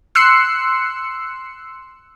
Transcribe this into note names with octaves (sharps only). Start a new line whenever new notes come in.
C6 E6 F#6 C7 C#7